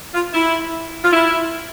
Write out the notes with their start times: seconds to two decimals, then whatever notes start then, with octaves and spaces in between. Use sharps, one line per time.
0.14 F4
0.33 E4
1.04 F4
1.13 E4